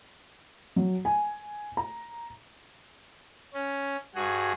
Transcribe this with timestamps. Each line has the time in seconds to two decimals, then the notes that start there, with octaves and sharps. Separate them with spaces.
0.76 F#3
1.05 G#5
1.77 A#5
3.54 C#4
4.15 G2 F#4 G#4